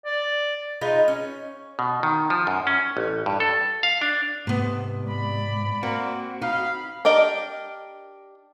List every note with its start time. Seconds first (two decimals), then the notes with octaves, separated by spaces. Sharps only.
0.05 D5
0.81 G#3 D#4 F4 B4
1.08 C#4
1.79 B2
2.03 D#3
2.30 F3
2.47 F#2
2.67 C#4
2.97 A1
3.26 G2
3.40 A4
3.83 F5
4.01 D4
4.47 G#2 C3 B3
5.06 D5 B5
5.83 A#3 C4 F#4
6.42 D#4 F5 B5
7.05 D4 G4 A#4 D#5